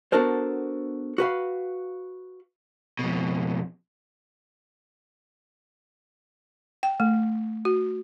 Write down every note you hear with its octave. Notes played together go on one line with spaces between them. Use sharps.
B3 D4 F#4 A4 A#4 C5
F#4 B4 F5
F2 B2
G5
A3
F#4